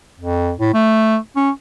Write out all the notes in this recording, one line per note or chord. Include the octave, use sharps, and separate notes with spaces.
F2
A2
A3
C#4